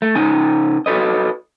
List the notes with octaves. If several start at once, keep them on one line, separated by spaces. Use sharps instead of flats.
A3
C#3 D#4 G#5
F#4 A4 B4 D#5